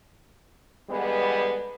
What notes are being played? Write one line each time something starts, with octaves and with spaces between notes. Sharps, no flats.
D3 E3 G3 G#3 B3